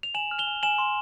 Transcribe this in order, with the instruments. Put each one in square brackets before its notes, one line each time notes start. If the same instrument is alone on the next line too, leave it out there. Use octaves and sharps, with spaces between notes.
[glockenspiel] F7
G#5 E7 F#7
F6
F7 G7
G#5
G#5 E7 F#7
C6